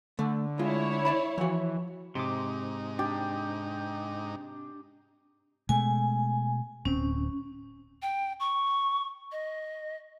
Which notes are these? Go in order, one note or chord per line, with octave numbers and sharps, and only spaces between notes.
D3 A3
G#3 E4 F4 C#5
D5 A5 B5
E3 F3 F#4
G#2 C3 D#4 C6 D6
D4 G4
B2 G#3 A3 G#5
D1 C4 C#4
G5
C#6
D#5